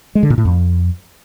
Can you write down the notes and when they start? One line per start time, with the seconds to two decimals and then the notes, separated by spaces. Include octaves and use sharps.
0.15 G#3
0.23 D3
0.30 A#2
0.38 A2
0.45 F2